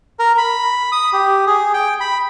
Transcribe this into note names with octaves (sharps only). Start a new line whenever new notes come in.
A#4
B5
D#6
G4
G#4
G5
B5